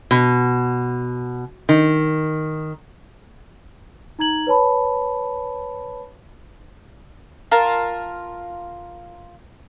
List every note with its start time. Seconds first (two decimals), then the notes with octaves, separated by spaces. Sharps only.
0.11 B2
1.69 D#3
4.19 D#4 A#5 G#6 F#7
4.47 B4 C#5 A5 B5
7.51 F4 A#4 A5